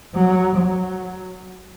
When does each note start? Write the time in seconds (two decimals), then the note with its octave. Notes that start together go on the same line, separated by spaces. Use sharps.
0.15 F#3
0.57 F#3